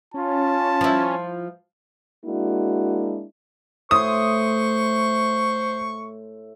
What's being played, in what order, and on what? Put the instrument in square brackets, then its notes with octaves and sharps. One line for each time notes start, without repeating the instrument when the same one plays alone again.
[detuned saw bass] C#4 [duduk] F4 [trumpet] A5
[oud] F3 E4
[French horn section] G#3 A#3 D4 E4 F#4
[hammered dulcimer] A2 C6 [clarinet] C5 [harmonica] C#6 [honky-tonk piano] D#6